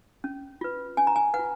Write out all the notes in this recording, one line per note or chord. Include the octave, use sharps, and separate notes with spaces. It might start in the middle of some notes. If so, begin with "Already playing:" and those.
C#4
F4 B4
C#4 G#5
A#5
G#5
B4 F#5
F4